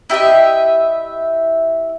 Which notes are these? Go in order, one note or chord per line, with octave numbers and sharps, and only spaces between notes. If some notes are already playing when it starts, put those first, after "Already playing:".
E4 G4 D#5 E5